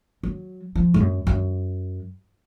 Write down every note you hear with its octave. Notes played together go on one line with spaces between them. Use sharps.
F#3
F3
G#2
F#2
F#2